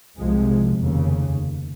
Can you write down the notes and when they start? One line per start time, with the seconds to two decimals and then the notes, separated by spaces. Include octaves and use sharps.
0.19 C2 C3 F3 G#3
0.79 F1 D#2 C#3